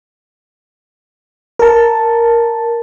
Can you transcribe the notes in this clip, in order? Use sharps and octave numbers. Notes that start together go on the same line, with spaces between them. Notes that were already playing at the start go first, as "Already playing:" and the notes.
A#4 A5